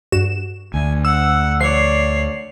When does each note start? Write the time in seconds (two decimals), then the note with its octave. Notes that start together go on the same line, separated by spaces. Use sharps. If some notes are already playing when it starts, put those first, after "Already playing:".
0.12 G2 F#4 E7
0.74 D2 G#5
1.05 F#5 E6
1.61 F3 C#5 D5 C7